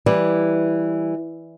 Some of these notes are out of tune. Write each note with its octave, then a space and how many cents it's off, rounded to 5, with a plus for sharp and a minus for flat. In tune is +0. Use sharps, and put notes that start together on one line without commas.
E3 +0 G3 +0